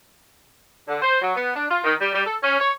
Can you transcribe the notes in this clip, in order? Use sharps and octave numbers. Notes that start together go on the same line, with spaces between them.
D3
C5
F#3
B3
D4
F4
D#3
G3
G3
A4
C#4
C#5